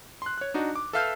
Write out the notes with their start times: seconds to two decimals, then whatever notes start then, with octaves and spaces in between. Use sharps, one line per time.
0.22 C6 F#6
0.38 C#5 F#6
0.54 D4 D#4 F#4
0.76 D6
0.93 A4 B4 E5 F5 F6 G6